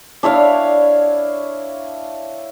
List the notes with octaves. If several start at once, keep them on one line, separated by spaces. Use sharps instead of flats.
D4 E4 C#5 F5